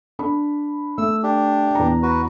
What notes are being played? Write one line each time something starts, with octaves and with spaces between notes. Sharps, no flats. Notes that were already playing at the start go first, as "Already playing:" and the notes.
D4 B5
A3 E6
D4 G4
E2 A#5
F#4 B4